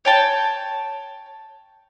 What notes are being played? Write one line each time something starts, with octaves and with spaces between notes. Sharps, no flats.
C#5 G5 A5